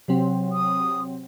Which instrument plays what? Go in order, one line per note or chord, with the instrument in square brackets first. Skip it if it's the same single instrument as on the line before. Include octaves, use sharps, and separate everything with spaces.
[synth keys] C3 F#3 C4
[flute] D#6